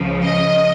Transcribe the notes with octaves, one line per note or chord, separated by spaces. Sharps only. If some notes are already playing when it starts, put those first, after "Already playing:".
Already playing: C#2 C#3 F3
D#5